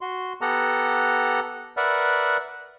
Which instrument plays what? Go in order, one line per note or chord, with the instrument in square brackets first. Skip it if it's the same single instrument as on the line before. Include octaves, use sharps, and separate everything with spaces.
[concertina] F#4 C6
B3 G4 A4 F#5 A#5
A#4 B4 D5 E5 F#5